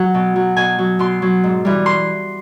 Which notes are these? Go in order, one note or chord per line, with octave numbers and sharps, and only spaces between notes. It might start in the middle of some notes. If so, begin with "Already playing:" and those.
Already playing: F#3 F#5
B2
F#3
B2 G#5
F#3
B2 C6
F#3
G#2
E3 G3
C6